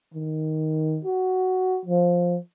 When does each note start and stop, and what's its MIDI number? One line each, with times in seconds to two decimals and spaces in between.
0.14 1.00 51
1.04 1.80 66
1.85 2.37 53